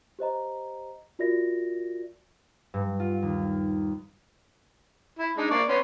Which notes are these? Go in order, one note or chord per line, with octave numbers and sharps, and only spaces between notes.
G4 C5 D#5 A#5
F4 F#4 A#4 D5 E5 A#6
G2
F4
D#2
E4
G#3 D4 D#4
A#3 D5 C#6
B3 C#4 C6